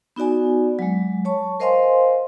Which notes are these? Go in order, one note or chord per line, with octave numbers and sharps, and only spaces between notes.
B3 D#4 F#4 D5 G#5
F#3 G#3
C#5 A5 C#6
A#4 C5 D#5 F5 G#5 C6